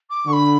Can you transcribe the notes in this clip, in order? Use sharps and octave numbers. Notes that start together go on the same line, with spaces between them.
D6
D3 B5 C#6